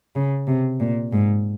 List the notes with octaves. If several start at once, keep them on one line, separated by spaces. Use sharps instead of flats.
C#3
C3
A#2
G#2